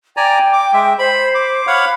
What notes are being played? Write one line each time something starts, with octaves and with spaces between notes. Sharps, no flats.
D5 G5 G#5 A#5
D6
G#3 E5
C5 B5
D6
C#5 F5 F#5 B5